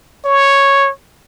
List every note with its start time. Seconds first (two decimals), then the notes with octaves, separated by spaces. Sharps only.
0.25 C#5